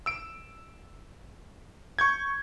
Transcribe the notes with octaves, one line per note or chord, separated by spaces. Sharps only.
E6 D7
C#6 G6 G#6